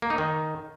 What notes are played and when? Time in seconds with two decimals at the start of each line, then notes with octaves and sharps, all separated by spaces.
0.02 A#3
0.10 D#4
0.18 D#3